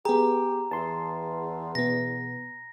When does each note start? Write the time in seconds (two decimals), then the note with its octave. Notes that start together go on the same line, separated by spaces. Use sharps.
0.05 B3 G4 G#4 A#5
0.71 E2 A5 C6
1.75 B2 B3 A#6